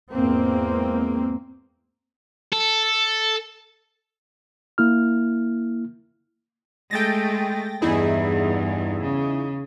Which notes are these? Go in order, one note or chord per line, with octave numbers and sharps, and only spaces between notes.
E2 G#2 A#3 C4
A4
A#3 E4 F6
G#3 A3 G5 A6 A#6
E2 G2 D#4 E4 G#4
C#3